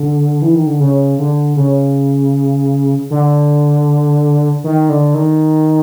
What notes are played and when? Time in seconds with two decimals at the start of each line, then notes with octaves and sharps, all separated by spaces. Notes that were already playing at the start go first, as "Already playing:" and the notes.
Already playing: D3
0.42 E3
0.55 D#3
0.67 D3
0.80 C#3
1.19 D3
1.56 C#3
3.11 D3
4.64 D#3
4.89 D3
5.15 D#3